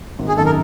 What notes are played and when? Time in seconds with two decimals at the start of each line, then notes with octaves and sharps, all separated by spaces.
0.19 G#1
0.28 G#4
0.37 F#2 D#3 A4
0.46 A#4